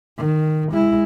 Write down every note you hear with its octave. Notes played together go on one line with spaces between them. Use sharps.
D#3
G#3 E4